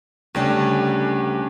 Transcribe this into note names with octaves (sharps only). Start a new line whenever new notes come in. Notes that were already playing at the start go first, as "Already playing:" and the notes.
D2 C#3 G3 A3 D4